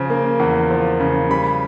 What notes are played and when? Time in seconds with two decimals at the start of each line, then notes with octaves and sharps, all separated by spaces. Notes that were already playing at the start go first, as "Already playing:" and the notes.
Already playing: C#3 F3
0.10 A#3
0.40 E2
0.70 F3
1.00 C#3
1.30 G3 B5